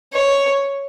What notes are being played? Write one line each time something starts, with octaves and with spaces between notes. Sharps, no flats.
C#5